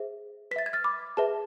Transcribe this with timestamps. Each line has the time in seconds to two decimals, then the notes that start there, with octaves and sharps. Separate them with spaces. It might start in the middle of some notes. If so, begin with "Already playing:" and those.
Already playing: G#4 C5 E5
0.51 B4 B6
0.56 E5 A6
0.66 G#6
0.73 F6 A6
0.84 B5 D6
1.17 G#4 B4 E5 A5